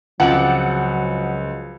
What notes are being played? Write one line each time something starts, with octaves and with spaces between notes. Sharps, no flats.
C#2 F3 F#3 C4 D5 F#5